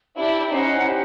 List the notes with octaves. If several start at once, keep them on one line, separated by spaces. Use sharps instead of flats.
D4 E4 G4
C#4 D#4 C5 D#5 F#5
G4